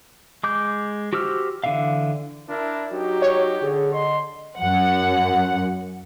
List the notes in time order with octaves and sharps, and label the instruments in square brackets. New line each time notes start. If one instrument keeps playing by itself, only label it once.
[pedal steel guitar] G#3 D6 G6
F#4 G4 C5 E6 F6
D3 E3 E5 F5
[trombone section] D4 E4 A#4
[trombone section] F#3 D#4 [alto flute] F#4 [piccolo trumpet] G4
[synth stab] C#5
[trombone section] D3 [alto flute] G#4
[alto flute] D#5 [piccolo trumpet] C6
[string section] F#2 F#5